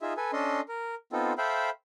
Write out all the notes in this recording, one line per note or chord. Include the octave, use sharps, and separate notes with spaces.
D#4 F4 G#4 E5
A4 B4 G#5
C#4 D4 A4 D#5 C6
A#4
B3 C4 D#4 F4 A4
A4 C5 E5 F5 G5 B5